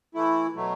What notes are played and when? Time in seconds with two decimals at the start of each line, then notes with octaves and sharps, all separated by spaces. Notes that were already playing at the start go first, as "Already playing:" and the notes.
0.15 E3 A3 E4
0.56 B2 F#3 A3